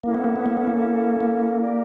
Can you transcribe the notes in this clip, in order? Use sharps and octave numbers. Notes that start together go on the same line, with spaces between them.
A#3 C#4 E4 A4
B3
A#3
B3
A#3
B3
A#3
A#3
G4 A#4 D5 G5